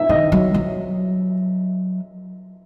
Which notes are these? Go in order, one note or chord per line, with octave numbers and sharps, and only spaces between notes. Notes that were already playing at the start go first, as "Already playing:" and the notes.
Already playing: E5
D#3 D#5
F#3
F#3